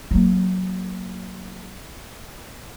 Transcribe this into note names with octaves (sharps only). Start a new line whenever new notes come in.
F#3 A#3